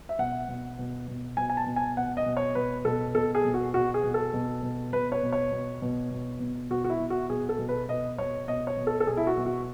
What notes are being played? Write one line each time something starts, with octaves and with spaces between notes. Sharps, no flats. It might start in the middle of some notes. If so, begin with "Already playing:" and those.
E5
B2 F#5
B2
B2
B2
B2 G#5
G#5
A5
B2
G#5
B2 F#5
D#5
B2
C#5
B2 B4
B2 A4
B2 A4
G#4
B2
F#4
B2 F#4
G#4
B2
A4
B2
B2
B2 B4
C#5
B2
C#5
B2
B2
B2
B2
B2 F#4
F#4
E4
B2
F#4
B2 G#4
A4
B2
B4
B2 D#5
B2 C#5
B2 D#5
C#5
B2
A4
A4
B2 G#4
E4
F#4
B2
F#4